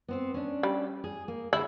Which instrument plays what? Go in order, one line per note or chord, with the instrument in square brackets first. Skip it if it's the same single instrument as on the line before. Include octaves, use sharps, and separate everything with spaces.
[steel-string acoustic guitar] B3 C4 C5
C#4 D4
[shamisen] G3
[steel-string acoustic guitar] G#4
A#3
[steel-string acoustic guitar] D3 G#4 [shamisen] E4